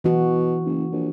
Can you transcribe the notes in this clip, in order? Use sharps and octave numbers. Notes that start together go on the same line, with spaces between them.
B2 E3 F#4
F#1
A#1